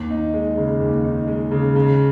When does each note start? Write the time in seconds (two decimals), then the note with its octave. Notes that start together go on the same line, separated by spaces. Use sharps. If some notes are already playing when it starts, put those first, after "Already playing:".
Already playing: D#2
0.10 D#4
0.34 G#3
0.57 C#3
0.80 D#2
1.04 D#4
1.27 G#3
1.51 C#3
1.76 C#3